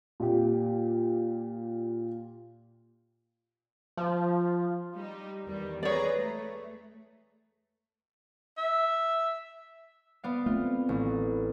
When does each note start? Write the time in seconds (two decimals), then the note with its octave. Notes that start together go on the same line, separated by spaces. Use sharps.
0.20 A#2 G4
3.97 F3
4.95 G3 D#4
5.47 E2 D#3 G3
5.83 G#4 B4 C#5 D5 A#5
6.16 A3
8.58 E5
10.24 B3 D5 F5
10.46 A3 C4 F4
10.89 A1